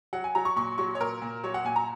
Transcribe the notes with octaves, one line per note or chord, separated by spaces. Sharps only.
F#3 F#5
G#5
F#3 A#5
C#6
A#2 C#6
F#3 C#6
C#5
A#2 A#4
A#2
F#3 C#5
F#5
A#2 G#5
A#5